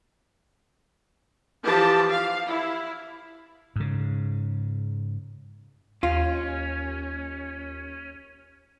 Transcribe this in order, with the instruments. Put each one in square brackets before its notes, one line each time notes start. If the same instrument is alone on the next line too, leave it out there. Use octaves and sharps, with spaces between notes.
[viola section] E3 F3 G4 A5
F5
E4
[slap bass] G#2 C#3
[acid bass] D#2 [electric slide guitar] C#4 [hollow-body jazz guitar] F4